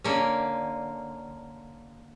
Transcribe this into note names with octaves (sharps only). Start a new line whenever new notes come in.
D3 A#3 C#4